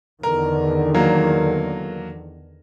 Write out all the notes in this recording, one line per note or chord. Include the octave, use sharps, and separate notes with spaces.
E2 D3 D#3 A#4
F#3 A#3 A#4